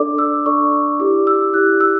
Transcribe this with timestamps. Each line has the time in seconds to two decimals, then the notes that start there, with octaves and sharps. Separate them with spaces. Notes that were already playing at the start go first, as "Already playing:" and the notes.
Already playing: D4 A4 D5 D6
0.18 E6
0.46 D4 A4 D5 C#6
0.72 C#6
0.99 E4 G4 D5 D6
1.27 E6
1.54 E4 G4 D5 F#6
1.81 E6